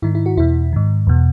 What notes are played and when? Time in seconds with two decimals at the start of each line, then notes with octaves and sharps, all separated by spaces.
0.02 G#2 D#3 E4
0.15 E4
0.26 F#4
0.37 E2 B2 E4
0.73 G#2 D#3
1.07 E2 B2